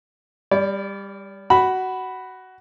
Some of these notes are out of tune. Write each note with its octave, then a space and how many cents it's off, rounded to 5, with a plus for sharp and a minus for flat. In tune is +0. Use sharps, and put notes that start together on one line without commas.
G3 +20 D5 -30
F#4 +15 B5 +0